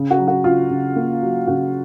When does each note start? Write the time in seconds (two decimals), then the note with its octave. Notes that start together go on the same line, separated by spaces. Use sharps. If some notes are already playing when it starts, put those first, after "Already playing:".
Already playing: C#3
0.11 F#4
0.19 F#3
0.28 F#4
0.44 C#3 F4
0.70 C#3
0.96 A#3
1.23 F#3
1.47 C#3 F#4